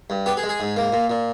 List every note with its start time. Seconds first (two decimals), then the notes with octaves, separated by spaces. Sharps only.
0.10 G2
0.26 B3 G4
0.37 G#4
0.43 G#3
0.49 G#4
0.60 G#2
0.76 A#3
0.93 A#2
1.10 A#2